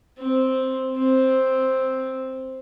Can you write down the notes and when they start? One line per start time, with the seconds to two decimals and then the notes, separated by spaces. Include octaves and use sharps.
0.18 C4
0.97 C4